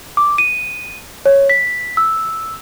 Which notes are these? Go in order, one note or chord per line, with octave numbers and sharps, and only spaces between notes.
D6
D#7
C#5
B6
E6